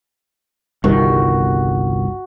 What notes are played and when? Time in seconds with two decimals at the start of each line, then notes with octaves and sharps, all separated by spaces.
0.84 G1 C2 D#3 F#4